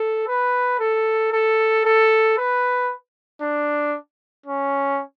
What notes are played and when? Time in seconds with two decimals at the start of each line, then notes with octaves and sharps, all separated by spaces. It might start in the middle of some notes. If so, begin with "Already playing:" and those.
Already playing: A4
0.28 B4
0.80 A4
1.32 A4
1.85 A4
2.38 B4
3.42 D4
4.46 C#4